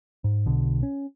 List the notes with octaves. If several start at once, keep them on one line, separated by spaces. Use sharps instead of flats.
G#2
B1 B2 D3
C#4